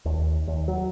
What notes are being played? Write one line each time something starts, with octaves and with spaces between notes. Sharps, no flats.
D#2
D#2
F#3